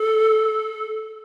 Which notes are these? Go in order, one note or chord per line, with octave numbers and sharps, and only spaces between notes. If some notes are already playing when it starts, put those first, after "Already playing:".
Already playing: A4